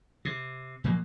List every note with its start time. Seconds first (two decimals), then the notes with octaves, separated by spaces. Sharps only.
0.25 C3
0.84 A#2 F3 F#3 A#3